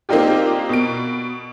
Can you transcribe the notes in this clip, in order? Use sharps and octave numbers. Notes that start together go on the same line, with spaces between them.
A#3 C4 D4 D#4 F4 G4
B2 D7